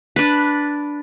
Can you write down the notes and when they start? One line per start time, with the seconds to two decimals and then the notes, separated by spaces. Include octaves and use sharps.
0.16 D4 B4